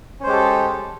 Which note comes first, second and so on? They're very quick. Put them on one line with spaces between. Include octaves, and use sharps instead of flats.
C#4 C5 G#3 G4 A4